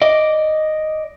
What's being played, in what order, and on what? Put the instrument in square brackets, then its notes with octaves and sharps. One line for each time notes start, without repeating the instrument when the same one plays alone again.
[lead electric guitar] D5 D#5